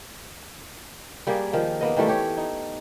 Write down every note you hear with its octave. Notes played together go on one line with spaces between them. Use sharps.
G3 A#3 G4 G#4
D#3 F3
A#3 B3 D#5
D#3 E3 G3 A3
G4 C#5
D#4